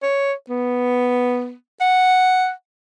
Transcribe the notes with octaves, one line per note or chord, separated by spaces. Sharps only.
C#5
B3
F#5